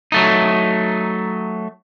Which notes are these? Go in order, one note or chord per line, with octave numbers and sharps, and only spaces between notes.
F#3 A3 D#4